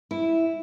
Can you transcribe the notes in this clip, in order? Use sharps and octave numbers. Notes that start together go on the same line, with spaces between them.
E4